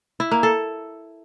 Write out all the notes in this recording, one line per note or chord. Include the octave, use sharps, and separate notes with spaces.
E4
A#3
A4